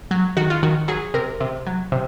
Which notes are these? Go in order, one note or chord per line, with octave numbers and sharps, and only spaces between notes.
F#3
D#3 F#4
F4
D#3 F#4
F#3 G#4
C3 A#4
C3
F#3
C3